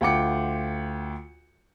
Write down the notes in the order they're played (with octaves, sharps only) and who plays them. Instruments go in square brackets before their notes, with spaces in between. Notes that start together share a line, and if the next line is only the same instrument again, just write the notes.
[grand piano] D2 F4 F#5 G5 D6 C#7